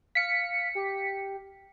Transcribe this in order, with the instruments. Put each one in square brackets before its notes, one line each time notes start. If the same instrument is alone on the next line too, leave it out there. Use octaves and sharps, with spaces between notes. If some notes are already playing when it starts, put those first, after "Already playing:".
[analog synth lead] F5 [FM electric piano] B6 C#7
[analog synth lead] G4